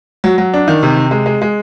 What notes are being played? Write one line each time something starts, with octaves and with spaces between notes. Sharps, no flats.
F#3
F#3
D4
D#3
C3
C3
G#3
G#3
G#3